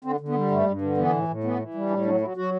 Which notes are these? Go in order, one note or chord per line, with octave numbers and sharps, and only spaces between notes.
D3 C4
D3
B3
G3
G2 A3
G2
D3
E3 B3
A2
A2
E3 B3
E3
G3
A2 D4
F#3 D4
F#3 E4
F#3 F#4